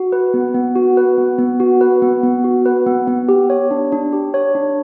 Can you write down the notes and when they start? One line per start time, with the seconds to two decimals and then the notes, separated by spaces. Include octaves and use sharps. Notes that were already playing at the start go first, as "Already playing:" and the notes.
Already playing: F#4
0.12 B4
0.34 B3
0.55 B3
0.76 F#4
0.97 B4
1.18 B3
1.39 B3
1.60 F#4
1.81 B4
2.02 B3
2.23 B3
2.44 F#4
2.65 B4
2.87 B3
3.08 B3
3.29 G4
3.50 C#5
3.71 D4
3.92 D4
4.13 G4
4.34 C#5
4.55 D4